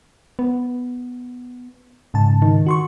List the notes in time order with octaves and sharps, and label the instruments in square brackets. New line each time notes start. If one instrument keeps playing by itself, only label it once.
[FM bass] B3
[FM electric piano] G#2 C#3 A5
[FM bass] D#3
[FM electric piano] F#4 C6 C#6